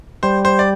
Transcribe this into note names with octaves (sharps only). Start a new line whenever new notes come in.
G3 C5
C5
D5